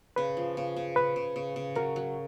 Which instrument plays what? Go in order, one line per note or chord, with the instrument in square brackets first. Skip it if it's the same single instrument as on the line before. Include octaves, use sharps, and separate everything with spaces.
[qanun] C#3 [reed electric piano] B4
[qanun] F3
C#3
C#3
[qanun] C#3 [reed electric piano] B4
[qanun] C#3
C#3
C#3
[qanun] F#3 [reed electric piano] A#4
[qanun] F#3